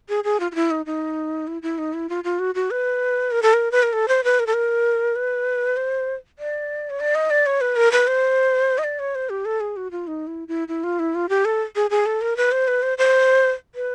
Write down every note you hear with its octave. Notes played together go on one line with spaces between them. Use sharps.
G#4
G#4
F4
F4
E4
D#4
D#4
E4
E4
D#4
E4
F4
F4
F#4
F#4
B4
A#4
A4
A#4
B4
A#4
A4
C5
B4
A#4
A4
A#4
B4
C5
D5
C#5
D5
D#5
D5
C#5
B4
A#4
B4
C5
D#5
D5
C#5
C5
G4
A4
G#4
F#4
F4
D#4
E4
E4
E4
F4
E4
F4
G4
A4
G#4
G#4
A4
A#4
B4
C5
B4
C5
C5
B4